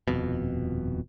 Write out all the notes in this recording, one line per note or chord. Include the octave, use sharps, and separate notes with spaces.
D#1 F2 B2